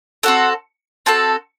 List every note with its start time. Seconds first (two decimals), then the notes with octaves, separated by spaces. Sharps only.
0.23 C4 F#4 A4 F#5
1.06 C4 F#4 A4 A5